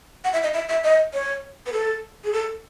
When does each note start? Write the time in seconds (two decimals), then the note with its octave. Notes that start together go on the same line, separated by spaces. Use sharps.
0.24 F#5
0.33 E5
0.43 D#5
0.54 E5
0.69 E5
0.84 D#5
1.14 C#5
1.66 B4
1.73 A4
2.24 G#4
2.33 A4